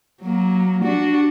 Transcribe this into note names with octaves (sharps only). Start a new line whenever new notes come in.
F#3 A#3
D4 F#4